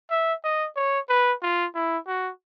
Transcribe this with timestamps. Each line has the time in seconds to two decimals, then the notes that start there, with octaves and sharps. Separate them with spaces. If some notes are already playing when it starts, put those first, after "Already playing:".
0.11 E5
0.44 D#5
0.76 C#5
1.09 B4
1.43 F4
1.75 E4
2.08 F#4